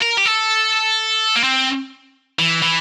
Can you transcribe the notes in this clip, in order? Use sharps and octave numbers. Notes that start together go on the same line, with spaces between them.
A#4
G4
A4
A#3
C4
E3
E3